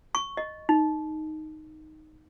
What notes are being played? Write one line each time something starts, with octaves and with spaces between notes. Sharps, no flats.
C#6
D#5
D#4